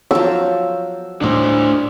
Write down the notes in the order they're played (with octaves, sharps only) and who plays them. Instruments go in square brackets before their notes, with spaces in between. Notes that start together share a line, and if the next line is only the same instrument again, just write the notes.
[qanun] F3 F#3 [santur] E6
[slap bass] D2 A2 G3 [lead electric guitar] D4 C5